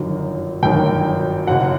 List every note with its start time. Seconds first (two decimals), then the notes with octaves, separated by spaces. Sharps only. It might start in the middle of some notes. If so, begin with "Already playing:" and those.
Already playing: G1 F#2 D#3 F#3
0.63 G1 F#2 D#3 F#3 G5
1.47 F#1 F#2 F#3 F#5